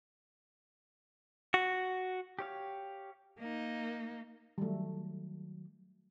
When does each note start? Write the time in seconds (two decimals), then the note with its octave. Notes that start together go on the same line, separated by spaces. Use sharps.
1.54 F#4
2.39 G4 C#5 F5
3.38 A#3 D#4
4.58 D#3 F#3 G3 A3